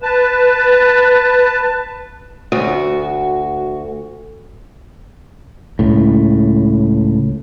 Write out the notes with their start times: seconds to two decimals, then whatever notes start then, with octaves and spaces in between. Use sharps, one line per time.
0.02 B4 A5
2.52 D2 F#4
5.79 C#2 A2